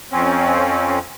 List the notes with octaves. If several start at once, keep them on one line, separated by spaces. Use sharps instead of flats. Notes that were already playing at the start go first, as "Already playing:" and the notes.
F2 C4 C#4